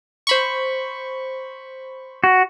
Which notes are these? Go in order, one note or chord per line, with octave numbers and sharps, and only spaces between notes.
C5 B5 C#6
F#4